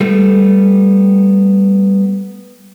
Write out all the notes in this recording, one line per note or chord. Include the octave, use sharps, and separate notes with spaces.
G3 A3 B3